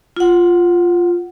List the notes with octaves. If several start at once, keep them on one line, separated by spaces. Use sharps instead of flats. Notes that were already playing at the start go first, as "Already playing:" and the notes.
F4 F#5